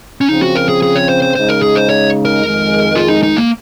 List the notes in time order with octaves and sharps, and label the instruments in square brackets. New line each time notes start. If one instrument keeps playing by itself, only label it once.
[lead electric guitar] C#4
[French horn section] C#3 F3 C4 [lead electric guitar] D#4
[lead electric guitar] F#4
A#4
G#4
G#4
C#5
C5
C5
[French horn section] C#3 G#3 D#4 [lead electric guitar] C5
[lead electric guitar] A#4
G#4
C5
C#5
A#4
[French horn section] F2 D#3 G#3
[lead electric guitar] F4
D#4
D#4
A#3